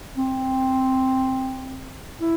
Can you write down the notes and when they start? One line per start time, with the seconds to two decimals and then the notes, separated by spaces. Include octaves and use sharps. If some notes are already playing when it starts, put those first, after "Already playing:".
0.17 C4
2.21 E4